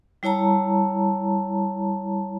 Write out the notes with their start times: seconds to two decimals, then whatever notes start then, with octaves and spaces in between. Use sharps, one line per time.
0.23 G3 E4 C#5 A5 A#5